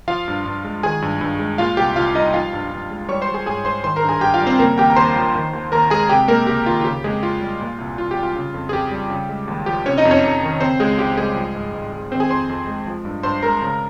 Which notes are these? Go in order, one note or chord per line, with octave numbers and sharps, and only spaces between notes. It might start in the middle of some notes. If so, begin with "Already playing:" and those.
F3 F4 F5
G2
G2
G#3
D#3 G#4 G#5
G2
G2
G#3
A#2 F4 F5
C2 G4 G5
C2 F4 F5
G3 D#4 D#5
F3 F4 F5
G2
G2
G#3
G3 C#5 C#6
C5 C6
G3
G#4 G#5
G#2 G#4 G#5
G#2 C5 C6
D#3 C5 C6
A#4 A#5
G2
G#4 G#5
G2 G4 G5
F4 F5
G3
C4 C5
C#3 A#3 A#4
D#2 G4 G5
A#5
D#2 C5 C6
F3
D#3
D#2
D#2 A#4 A#5
G#3 G#4 G#5
C3 G4 G5
G#3 A#3 A#4
C#2 G4
D#3 F4
F4
C#3 G4
F2 G#3 G#4
F2 F4
G3
A#2
C2
C2 F4
G4
G3
F4
C#3
F2
G#4
F2 G4
G3
C#3
G#3
D#2
F3 G4
C3 C#4 C#5
D#4 D#5
F2
C#4 C#5
F2
D#3
C#3 C4 C5
C#2 G#3 G#4
C#2 G4
G3 G#3 G#4
F3
G#2
G#2
G#3
D#3 C4 C5
G#4 G#5
F2 C5 C6
F2
G#3
F3
G2
G2 C5 C6
G#3 A#4 A#5
C#3